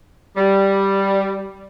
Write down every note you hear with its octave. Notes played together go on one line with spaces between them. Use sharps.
G3